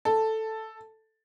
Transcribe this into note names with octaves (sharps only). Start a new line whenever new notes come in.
A4